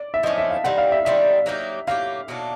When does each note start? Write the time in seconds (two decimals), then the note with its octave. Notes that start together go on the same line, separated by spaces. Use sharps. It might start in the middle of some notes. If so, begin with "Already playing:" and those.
Already playing: D5
0.14 E5
0.23 F3 A3 C#4 D#5
0.38 E5
0.51 F5
0.64 D#3 G3 C4 F#5
0.78 F5
0.92 E5
1.05 D#3 G3 C4 E5
1.46 F#3 A#3 D#4 G4
1.87 F#3 A#3 D#4 G4 F5
2.28 B2 F#3 A#3 D4